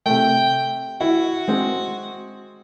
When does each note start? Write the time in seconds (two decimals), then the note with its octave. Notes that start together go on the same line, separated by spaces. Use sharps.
0.06 C3 A3 G5
1.01 E4 F#4
1.48 G#3 C4